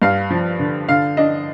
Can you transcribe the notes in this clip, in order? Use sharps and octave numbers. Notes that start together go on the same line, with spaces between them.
G2 F5
F3
D3
D3 F5
D4 D#5